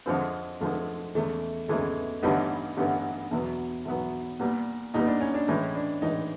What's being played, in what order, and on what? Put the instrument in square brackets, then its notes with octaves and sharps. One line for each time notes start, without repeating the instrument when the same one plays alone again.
[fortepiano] F2 D3 F3 G#3 C4
[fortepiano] F2 D3 F3 G#3 C4 [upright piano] A3
[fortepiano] E2 C#3 E3 G#3 [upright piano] A3
[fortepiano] E2 C#3 E3 G#3 [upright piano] A3
[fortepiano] A1 G2 D3 G3 B3 [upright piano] D#4
[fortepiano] A1 G2 D3 G3 B3
E2 B2 F#3 B3
E2 B2 F#3 B3
A#2 G3 B3
[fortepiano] A#2 G3 B3 [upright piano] D#4
[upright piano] D4
C#4
D4
[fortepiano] A2 E3 G#3 [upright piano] C#4
[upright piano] D4
[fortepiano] A2 E3 G#3 [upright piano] D#4